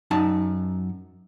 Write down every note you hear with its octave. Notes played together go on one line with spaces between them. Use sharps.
F#2 D#4 A5